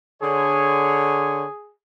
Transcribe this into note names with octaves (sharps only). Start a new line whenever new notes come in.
D3 G#4 C#5